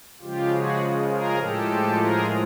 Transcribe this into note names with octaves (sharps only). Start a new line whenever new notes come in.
C#3 F3 G#3 F4 G4
F#4 G#4
G#4 A#4
A2 F3 G#3 G4 A4
G#4 A#4